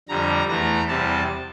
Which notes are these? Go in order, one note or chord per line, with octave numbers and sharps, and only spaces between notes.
F2 D3 G3 A#5
E2 E3 A3 A#5
E2 C3 G3 A5